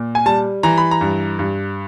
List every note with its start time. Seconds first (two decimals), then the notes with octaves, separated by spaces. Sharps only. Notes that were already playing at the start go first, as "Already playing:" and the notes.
Already playing: A#2
0.15 G#5
0.26 G3 A5
0.63 E3 A#5
0.78 B5
0.91 A#5
1.01 G2
1.39 G2